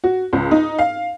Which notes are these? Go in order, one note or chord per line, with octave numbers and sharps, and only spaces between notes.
F#4
C#2
D#4
F5